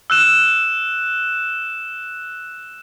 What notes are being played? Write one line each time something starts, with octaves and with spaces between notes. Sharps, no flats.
E6 F#6 E7